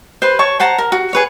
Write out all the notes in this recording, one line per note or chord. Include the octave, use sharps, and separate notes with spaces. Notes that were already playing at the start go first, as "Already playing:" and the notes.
B4 C5
C#5 A5 C#6
C5 F#5 A5 A#5
A#4
F#4
G#4 B4 C#5